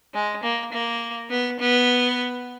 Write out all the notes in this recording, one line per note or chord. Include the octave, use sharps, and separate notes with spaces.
G#3
A#3
A#3
B3
B3